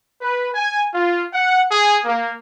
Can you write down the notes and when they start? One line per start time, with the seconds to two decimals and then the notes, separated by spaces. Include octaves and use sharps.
0.22 B4
0.55 G#5
0.95 F4
1.34 F#5
1.72 G#4
2.05 A#3